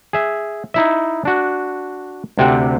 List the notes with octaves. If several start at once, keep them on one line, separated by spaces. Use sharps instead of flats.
G#4 E5
D#4 E4 E5
D4 F#4
D2 C3 C4 G4 F#5